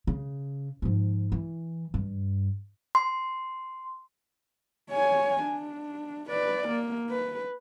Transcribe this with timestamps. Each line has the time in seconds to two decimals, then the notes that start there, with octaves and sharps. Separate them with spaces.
0.07 C#3
0.82 G#2 F3
1.32 E3
1.94 G2
2.95 C6
4.91 C#5 G#5
5.43 D4
6.30 B4 D5
6.69 A#3
7.10 B4